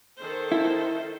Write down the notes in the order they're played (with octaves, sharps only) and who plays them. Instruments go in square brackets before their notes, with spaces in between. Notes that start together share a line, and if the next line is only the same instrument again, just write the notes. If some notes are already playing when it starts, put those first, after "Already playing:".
[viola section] D#3 A4 C5
[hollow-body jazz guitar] E4